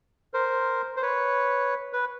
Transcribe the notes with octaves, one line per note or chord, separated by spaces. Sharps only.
A#4 C5
C5
B4 C#5
B4